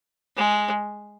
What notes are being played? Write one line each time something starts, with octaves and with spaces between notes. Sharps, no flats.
G#3